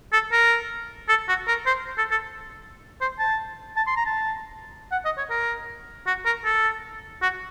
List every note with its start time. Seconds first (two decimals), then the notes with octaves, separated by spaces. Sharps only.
0.13 A4
0.32 A#4
1.09 A4
1.29 F#4
1.48 A#4
1.66 C5
1.98 A4
2.11 A4
3.01 C5
3.19 A5
3.77 A5
3.87 C6
3.97 A#5
4.06 A5
4.92 F#5
5.05 D#5
5.18 C#5
5.30 A#4
6.07 F#4
6.26 A#4
6.45 A4
7.22 F#4